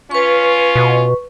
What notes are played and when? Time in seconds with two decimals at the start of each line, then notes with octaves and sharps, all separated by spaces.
0.11 C#4 F4 B4 C#6
0.76 B2